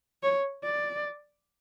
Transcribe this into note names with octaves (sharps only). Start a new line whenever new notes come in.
C#5
D5